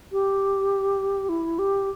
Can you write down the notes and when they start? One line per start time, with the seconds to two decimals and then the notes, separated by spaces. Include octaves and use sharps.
0.12 G4
1.29 E4
1.59 G4